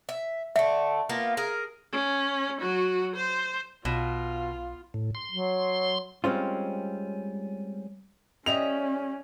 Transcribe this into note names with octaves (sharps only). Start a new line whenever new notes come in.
E5
D3 A3 E5
A#3 B3 F4
G#4 A#4
C#4
F#3 F#4
C5
B1 B2 F4
A2
C6
F#3
G3 G#3 C4 C#4 F4
G3 C#4 D#5 E5 F7